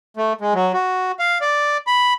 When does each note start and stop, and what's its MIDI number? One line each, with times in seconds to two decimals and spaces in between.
0.17 0.33 57
0.41 0.54 56
0.54 0.72 54
0.73 1.12 66
1.19 1.38 77
1.41 1.77 74
1.87 2.13 83